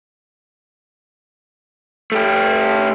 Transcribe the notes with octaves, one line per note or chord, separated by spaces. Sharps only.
A3 G4